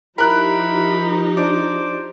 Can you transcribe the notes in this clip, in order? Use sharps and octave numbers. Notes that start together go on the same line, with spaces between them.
F3 D#4 E4 G4 A#4 B5 F#6
D4 C5 D6